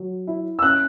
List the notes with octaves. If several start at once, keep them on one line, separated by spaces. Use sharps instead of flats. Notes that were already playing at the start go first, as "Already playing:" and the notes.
Already playing: F#3
E4
E6
C#4 F#6